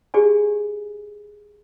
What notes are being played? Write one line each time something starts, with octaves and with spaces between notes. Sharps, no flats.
G4 G#4 D5 G#5